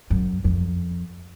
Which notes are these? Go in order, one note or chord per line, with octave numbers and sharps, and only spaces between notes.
F#2
F2